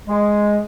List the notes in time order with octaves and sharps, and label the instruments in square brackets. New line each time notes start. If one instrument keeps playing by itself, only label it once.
[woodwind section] G#3